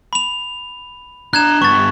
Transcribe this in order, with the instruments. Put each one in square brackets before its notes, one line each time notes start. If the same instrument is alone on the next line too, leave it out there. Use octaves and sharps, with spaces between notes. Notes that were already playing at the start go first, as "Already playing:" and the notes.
[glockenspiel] B5 F7
[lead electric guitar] D4 A#5 [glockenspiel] F#6 G#6 E7
[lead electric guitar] G2 B3 [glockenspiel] C#6 A6